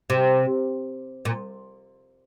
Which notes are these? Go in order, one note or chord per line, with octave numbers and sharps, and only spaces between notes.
C3
A#2